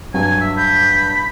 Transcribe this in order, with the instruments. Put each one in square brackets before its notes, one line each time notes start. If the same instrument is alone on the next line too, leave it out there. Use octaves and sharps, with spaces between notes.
[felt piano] G2 F#3 [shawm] G#5
[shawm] E5
[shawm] B5 [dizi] G6